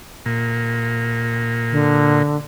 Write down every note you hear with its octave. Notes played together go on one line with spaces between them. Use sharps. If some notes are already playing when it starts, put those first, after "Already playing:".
A#2
D3